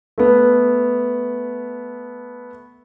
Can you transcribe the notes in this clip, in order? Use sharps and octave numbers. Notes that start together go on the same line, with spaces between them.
A3 B3